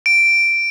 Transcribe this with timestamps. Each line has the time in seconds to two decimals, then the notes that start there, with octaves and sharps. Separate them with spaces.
0.06 D7